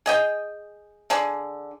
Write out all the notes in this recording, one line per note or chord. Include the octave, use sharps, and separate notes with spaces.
G#4 D#5 G5
D3 G#4 D5